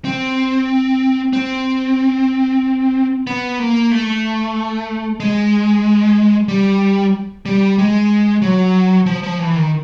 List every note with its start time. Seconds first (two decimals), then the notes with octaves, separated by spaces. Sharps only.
0.05 C4
1.33 C4
3.27 B3
3.59 A#3
3.91 A3
5.20 G#3
6.48 G3
7.46 G3
7.78 G#3
8.42 F#3
9.06 F3
9.23 F3
9.39 E3
9.55 D#3